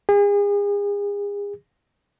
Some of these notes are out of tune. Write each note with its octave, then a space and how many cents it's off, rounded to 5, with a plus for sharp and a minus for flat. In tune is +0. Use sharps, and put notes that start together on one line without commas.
G#4 -40